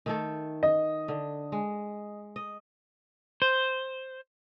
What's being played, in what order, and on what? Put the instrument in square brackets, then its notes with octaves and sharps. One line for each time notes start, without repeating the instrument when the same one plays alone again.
[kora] D#3 A3 A4
[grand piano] D#5
[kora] D3
G#3
D#5
[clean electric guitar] C5